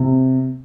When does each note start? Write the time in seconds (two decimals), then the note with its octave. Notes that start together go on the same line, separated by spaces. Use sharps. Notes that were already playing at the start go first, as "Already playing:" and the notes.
Already playing: C3